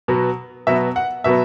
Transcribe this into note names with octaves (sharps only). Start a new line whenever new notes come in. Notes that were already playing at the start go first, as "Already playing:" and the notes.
B2 F#3 B3
B2 F#3 B3 E5
F#5
B2 F#3 B3 E5